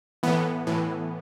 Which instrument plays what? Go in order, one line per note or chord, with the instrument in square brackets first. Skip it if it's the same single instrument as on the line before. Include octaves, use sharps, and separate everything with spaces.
[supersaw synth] A2 E3 B3
A2 E3